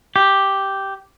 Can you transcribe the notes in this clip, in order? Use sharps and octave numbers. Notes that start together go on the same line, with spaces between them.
G4